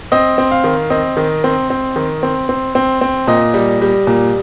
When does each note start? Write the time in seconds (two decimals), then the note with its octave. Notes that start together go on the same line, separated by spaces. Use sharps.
0.12 C4 D#5
0.38 C4
0.51 F5
0.64 D#3
0.90 C4 D#5
1.17 D#3
1.44 C4
1.70 C4
1.96 D#3
2.23 C4
2.49 C4
2.75 C4
3.01 C4
3.27 A#2 D#5
3.54 G3
3.81 G3
4.07 A#2